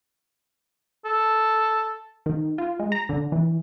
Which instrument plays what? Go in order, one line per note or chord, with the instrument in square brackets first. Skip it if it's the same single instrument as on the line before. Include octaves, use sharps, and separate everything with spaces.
[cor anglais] A4
[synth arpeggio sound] D#3
F4
G#3
A#5
D3
E3